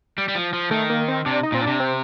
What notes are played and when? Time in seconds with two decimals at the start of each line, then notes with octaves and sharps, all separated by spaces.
0.18 G3
0.28 G3
0.35 F3
0.53 F3
0.71 D#3 A3
0.90 A#3
1.08 C4
1.26 C3 D4
1.43 D#4
1.52 A#2 C4
1.62 D4
1.67 C3
1.80 C4